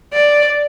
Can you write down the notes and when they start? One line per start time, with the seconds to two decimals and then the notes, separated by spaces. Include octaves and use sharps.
0.13 D5